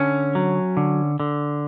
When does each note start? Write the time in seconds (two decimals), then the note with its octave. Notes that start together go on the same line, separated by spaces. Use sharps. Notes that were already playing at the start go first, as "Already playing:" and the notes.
Already playing: D3 C#4
0.35 F#3
0.77 D3
1.20 D3